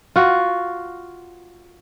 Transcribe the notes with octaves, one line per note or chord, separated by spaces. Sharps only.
F4 F#4